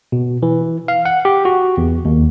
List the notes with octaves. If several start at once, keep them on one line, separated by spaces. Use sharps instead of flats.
B2
E3
F5
F#5
G4
F#4
E2
D#2